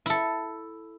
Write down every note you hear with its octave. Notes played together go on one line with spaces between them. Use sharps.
E4 A4